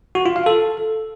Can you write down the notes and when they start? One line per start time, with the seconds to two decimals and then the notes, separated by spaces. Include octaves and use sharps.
0.15 F#4
0.26 F4
0.36 F5
0.46 A4